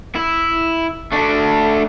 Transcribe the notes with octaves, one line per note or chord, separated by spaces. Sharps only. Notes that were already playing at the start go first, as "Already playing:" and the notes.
E4
A3 D4